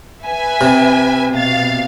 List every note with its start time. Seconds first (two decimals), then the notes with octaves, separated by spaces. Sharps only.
0.25 B4 E5 G#5
0.61 C3
1.33 B2 F5 A6